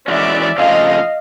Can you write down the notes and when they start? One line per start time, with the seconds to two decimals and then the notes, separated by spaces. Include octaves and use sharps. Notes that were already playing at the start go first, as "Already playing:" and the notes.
0.08 E3 G#3 C#4 F#4 D5 E5
0.58 F2 C#3 F3 A3 D#5 F5